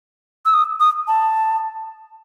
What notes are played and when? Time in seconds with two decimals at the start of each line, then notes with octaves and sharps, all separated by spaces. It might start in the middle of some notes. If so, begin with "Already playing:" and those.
0.46 E6
0.54 D#6
0.80 D#6
1.08 A5